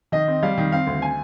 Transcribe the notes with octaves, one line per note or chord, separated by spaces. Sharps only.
D#3 D#5
C4
G3 F5
D#3
C4 F5
D2
G#5